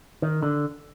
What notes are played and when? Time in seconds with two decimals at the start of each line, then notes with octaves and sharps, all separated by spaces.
0.22 D#3
0.43 D3